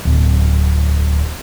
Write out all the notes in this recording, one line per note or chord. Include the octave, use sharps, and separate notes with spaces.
D1